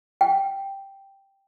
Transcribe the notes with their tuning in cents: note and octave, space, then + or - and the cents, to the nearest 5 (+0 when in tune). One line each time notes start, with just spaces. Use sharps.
G5 +0